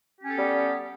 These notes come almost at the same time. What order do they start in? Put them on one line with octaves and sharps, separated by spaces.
G4 C#4 A4 B3 G3